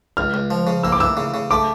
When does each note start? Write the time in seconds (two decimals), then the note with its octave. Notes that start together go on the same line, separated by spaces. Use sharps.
0.17 C#2 F6
0.34 C#2
0.51 F3
0.67 C#3
0.83 A#3 E6
0.92 D6
1.00 E3 E6
1.17 C#3
1.34 C#3
1.51 A3 D6